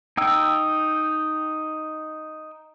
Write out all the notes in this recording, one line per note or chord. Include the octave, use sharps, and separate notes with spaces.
D#4 G5 E6